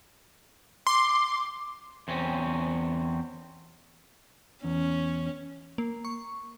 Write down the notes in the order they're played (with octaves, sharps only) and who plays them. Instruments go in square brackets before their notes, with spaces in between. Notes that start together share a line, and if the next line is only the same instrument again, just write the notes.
[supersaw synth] C6 [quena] D6
[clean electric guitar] E2 C4 C#4
[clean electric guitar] E2 [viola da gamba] C#4
[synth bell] A#3
C#6